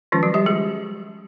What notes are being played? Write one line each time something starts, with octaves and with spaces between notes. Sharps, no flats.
D#3 F3 G#3 C#4 F4
F#3 F#4
G3 G4
G#3 G#4